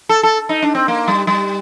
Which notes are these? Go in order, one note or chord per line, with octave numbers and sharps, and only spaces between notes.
A4
A4
D#4
D4
C4
A#3
G3
G3